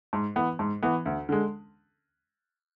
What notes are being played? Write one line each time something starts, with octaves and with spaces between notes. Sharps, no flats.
G#2
E3 B3
G#2
E3 B3
D2
D3 G#3